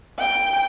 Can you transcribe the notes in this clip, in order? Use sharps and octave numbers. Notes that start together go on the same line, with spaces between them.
G5